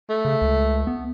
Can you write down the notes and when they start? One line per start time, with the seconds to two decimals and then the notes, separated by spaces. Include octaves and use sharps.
0.10 A3
0.25 C#3
0.42 C#2
0.87 B3